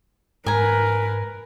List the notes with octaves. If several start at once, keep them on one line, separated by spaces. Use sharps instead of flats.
G#2 A#4 B4 G#5 A#5